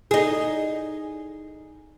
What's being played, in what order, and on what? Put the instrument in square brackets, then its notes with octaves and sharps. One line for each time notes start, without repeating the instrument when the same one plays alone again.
[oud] D#4 G#4